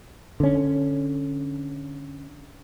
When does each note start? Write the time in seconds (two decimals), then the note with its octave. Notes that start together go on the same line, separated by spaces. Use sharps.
0.40 D3 C#4